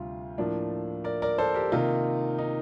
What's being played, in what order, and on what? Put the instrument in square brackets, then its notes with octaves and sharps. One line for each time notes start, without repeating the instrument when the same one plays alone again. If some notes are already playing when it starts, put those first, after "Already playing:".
Already playing: [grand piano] D2 C3 G3 F4
A2 F3 A#3 D4
A#4 D5
A#4 D5
A4 C5
G4 A#4
C3 D#3 A#3 D#4 F4
D#4